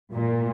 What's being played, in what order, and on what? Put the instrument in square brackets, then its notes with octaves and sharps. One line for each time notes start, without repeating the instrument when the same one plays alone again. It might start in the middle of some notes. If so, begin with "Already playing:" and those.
[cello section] A#2